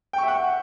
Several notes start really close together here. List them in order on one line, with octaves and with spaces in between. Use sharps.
G5 C#6 E5 F#5